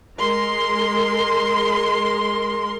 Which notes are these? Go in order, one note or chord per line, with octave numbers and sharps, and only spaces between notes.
G#3 A#4 C6